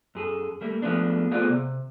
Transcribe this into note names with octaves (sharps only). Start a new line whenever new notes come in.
F#2 G#4 A4
G3 A3 A#3
F3 G#3 A3 B3 D4
A3 B3 C4 F4 G#4 D5
C3